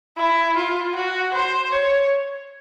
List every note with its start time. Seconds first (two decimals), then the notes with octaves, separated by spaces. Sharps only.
0.17 E4
0.56 F4
0.95 F#4
1.34 C5
1.72 C#5